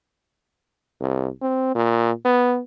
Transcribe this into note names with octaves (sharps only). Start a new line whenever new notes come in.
C2
C4
A#2
B3